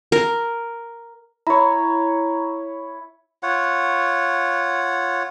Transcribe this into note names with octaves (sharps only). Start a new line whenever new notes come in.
A#4
E4 C#5 A#5
F4 C#5 F#5